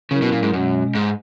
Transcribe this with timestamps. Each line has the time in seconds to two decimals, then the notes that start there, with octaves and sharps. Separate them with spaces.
0.11 C#3 F#3 C#4 E4 A#4
0.22 B2
0.32 A#2
0.42 G#2
0.52 F#2 B2 G#3 C#4
0.95 G#2